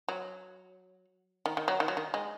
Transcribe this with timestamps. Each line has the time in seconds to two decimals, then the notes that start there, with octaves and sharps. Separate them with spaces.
0.08 F#3
1.46 D#3
1.57 D#3
1.68 F#3
1.80 D#3
1.88 F#3
1.97 D#3
2.14 G#3